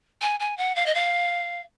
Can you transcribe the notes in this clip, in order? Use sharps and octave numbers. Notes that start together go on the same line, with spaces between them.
G#5
G#5
F#5
F5
D#5
F5